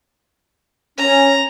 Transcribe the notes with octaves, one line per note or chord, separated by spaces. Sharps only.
C#4 A#5